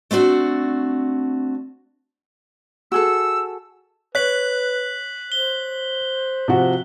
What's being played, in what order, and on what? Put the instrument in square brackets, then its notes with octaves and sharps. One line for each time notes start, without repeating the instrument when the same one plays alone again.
[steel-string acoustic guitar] A3 C4 D4 F#4
[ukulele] F#4 G#4 A4 [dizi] E6
[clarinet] B4 [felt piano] C#5 [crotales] F#6 B6 F#7
[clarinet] C5 [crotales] G7
[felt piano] C3 F3 F#4